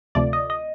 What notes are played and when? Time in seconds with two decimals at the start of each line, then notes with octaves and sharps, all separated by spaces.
0.15 D2 C3 F3 A3 D5
0.33 D#5
0.50 D#5